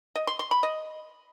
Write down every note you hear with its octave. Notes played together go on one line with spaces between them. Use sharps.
D#5
C6
C6
B5
D#5